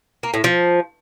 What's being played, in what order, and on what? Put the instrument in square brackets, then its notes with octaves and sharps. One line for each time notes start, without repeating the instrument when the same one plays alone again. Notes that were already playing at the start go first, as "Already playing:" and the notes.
[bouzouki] A#3
A2
F3